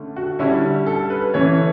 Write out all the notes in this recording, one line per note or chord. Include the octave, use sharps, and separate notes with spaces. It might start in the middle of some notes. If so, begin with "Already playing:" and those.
Already playing: D3 A3 C#4
F#4
D3 G3 C#4 E4
A4
B4
E3 A3 C#4 C#5